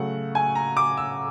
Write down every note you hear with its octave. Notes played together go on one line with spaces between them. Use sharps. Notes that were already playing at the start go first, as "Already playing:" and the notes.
Already playing: C#3 F#3 A3 F#5
G#5
A#5
D6
E6